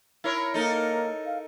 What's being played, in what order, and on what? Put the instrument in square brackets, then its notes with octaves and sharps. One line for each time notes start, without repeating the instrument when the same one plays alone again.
[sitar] E4 A#4 C#5
[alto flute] A#3 [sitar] D#4 A4 A#4
[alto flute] F5